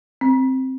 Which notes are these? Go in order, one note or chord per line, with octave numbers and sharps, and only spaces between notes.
C4